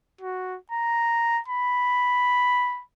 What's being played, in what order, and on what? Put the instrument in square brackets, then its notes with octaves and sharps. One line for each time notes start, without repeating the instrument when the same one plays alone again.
[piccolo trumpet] F#4
A#5
B5